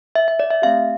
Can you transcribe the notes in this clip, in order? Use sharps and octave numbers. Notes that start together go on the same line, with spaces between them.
E5
E5
D5
E5
A3 C4 G4 F5